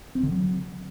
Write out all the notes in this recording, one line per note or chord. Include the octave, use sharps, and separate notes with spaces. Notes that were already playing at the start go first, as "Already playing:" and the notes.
C4
D3
F#3